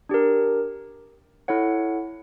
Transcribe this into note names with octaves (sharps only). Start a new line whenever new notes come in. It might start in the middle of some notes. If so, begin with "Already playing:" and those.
D4 G4 A#4
E4 A4 C#5 F#5